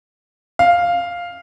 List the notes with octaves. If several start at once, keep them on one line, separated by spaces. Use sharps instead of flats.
F5